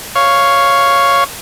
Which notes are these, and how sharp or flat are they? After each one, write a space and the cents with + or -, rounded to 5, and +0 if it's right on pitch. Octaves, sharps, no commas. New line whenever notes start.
C#5 +0 F5 +0